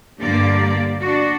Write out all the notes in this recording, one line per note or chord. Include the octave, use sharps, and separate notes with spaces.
G2 D3 A#3 G4 D5
D4 F#4